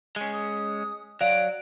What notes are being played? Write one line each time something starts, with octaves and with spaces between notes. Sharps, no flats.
G#3 C#4
D#6
F#3 D5 F5 D7